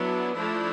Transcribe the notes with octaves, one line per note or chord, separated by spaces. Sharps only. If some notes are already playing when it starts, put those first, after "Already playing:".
Already playing: F#3 B3 D4 E4
F3 A3 D4 E4